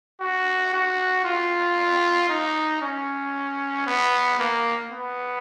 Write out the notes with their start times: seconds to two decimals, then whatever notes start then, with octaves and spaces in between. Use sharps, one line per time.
0.20 F#4
0.73 F#4
1.25 F4
2.29 D#4
2.82 C#4
3.87 B3
4.39 A#3
4.92 B3